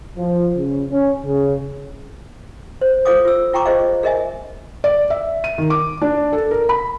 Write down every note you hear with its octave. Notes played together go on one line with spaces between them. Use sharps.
F3
C#3
C#4
C#3
C5
F4 A4 C5 F5 D6 D#6
F4 E6
F4 G5 A#5 C#6 D6
F4 G#4 C5 D#5 F5
G#4 A#4 D#5 E5 G#5
D5
E5
D#7
D#3
D6
D4
A4
A#4
B5